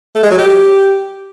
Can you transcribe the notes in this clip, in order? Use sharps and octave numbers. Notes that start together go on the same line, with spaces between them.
A3
G#3
F#3
G4